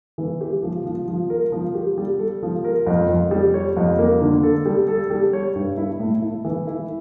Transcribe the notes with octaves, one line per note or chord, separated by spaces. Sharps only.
E3
G4
F3
F3
F3
A#4
F3
G4
G3
A4
F3
A#4
F2
F2
G3
C#5
F2
A#3
D3
A4
G3
A4
G3
C#5
G2
E4
A2
E4
E3
E4